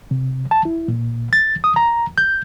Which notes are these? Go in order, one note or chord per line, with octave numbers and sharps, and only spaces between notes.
C3
A5
E4
A#2
A6
D#6
A#5
G6